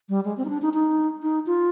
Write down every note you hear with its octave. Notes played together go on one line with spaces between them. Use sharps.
G3
G#3
C4
D#4
D4
D#4
D#4
D#4
F4